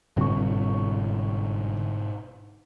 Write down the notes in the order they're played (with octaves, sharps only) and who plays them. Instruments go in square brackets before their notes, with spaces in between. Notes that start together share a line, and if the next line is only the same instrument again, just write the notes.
[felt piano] G1 C#6 [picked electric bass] G#2 B2 C4